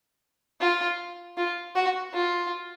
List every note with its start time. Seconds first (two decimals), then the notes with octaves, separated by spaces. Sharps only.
0.60 F4
1.37 F4
1.75 F#4
2.14 F4